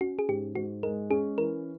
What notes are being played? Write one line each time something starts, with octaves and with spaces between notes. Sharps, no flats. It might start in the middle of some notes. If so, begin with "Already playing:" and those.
C#4 F#4
G#4
G#2 G4
G#2 F#4
G#3 A#4
C#4 G#4
E3 A#4